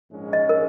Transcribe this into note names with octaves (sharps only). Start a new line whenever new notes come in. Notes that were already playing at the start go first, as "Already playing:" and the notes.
A#1 G#2 G#3 C#4
D#5
A#4